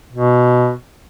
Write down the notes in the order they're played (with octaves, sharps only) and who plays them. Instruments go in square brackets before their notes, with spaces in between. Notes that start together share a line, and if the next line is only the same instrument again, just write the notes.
[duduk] B2